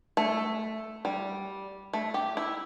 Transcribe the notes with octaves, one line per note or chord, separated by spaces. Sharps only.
A3
G3
A3
G4
E4